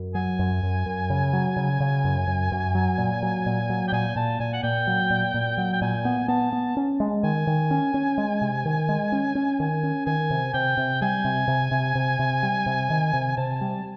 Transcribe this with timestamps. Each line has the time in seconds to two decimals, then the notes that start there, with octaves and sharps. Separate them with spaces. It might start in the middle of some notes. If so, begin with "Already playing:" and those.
Already playing: F#2
0.15 F#3 G#5
0.39 F#2
0.63 F#2
0.86 F#2
1.10 C#3
1.33 F#3
1.57 C#3
1.80 C#3
2.04 F#2
2.27 F#2
2.52 F#2
2.75 F#3
2.98 A#2
3.23 F#3
3.46 A#2
3.70 F#3
3.88 G5
3.92 A#2 G#5
4.16 A#2 A5
4.40 A#2 G#5
4.54 F#5
4.63 A#2 G5
4.87 F#3
5.10 A#2
5.34 A#2
5.58 F#3
5.73 G5
5.82 A#2 G#5
6.05 B3
6.28 B3 A5
6.53 B3
6.77 C#4
7.00 G#3
7.23 D#3 G#5
7.47 D#3
7.71 C#4
7.94 C#4
8.18 G#3
8.42 C3
8.65 D#3
8.89 G#3
9.12 C#4
9.35 C#4
9.60 D#3 G#5
9.83 C#4
10.06 D#3 G#5
10.30 C3
10.54 C3 G5
10.77 C3
11.02 G3 G#5
11.25 C3
11.48 C3
11.71 C3
11.95 C3
12.19 C3
12.43 G3
12.66 C3
12.90 D#3
13.14 C3
13.37 C3 A5
13.61 G3